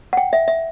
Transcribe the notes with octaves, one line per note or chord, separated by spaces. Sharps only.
F#5
G5
E5
E5